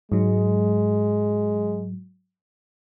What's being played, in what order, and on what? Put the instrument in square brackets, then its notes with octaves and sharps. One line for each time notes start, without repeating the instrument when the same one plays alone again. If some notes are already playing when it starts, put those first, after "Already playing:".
[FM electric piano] G#2 F#3 [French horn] G#3